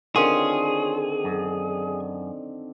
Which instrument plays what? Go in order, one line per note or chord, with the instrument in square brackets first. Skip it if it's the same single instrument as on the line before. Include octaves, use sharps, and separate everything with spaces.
[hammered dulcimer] D3 D#3 C4 [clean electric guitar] C#4 F4 [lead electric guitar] G#4
[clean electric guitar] F#2